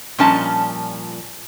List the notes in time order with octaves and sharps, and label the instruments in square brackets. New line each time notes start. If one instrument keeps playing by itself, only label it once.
[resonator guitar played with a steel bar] A#2 F3 G3 C#4 D#5 A5